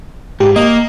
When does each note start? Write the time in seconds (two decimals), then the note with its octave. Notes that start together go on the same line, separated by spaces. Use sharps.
0.40 G#2 G4
0.56 A#3 D#5